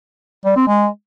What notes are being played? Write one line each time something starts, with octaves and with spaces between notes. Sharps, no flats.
G3
C4
G#3